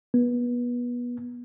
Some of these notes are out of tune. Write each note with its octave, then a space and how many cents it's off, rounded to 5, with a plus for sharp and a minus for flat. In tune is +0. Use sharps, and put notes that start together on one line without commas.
B3 -25